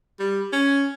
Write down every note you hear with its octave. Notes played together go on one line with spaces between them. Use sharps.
G3
C#4